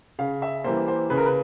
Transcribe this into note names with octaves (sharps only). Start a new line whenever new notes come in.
C#3 F5
E5
E3 G3 A#3 C5
C5
C#3 B4
A#4
B4